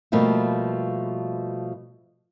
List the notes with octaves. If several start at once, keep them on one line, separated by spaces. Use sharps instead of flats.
B2 F3 G3 A3 A#3